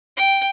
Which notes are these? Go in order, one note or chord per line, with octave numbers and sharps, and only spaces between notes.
G5